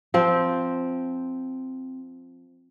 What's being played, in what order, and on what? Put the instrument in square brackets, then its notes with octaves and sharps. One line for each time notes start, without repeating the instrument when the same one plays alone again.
[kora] F3 C4